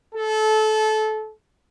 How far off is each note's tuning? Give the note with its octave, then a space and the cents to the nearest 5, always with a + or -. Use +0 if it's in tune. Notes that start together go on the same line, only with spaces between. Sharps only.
A4 -25